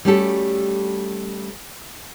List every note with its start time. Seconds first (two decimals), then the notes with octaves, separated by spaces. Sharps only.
0.05 G3 A3 C#4 F#4 G4 A4